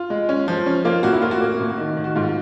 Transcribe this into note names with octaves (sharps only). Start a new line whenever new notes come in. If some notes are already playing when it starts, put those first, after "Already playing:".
Already playing: F4
G#3
C#4
F3
C#4
A#3 F4
A2 F#4
E4
A#3 F4
F#4
A#3
A2
D#3
D#3
F#4
G#2 F4